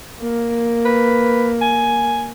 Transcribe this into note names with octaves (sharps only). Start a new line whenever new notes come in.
A#3
B4
G#5